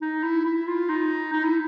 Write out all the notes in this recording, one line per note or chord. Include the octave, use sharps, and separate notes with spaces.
D#4
E4
E4
F4
D#4
D#4
E4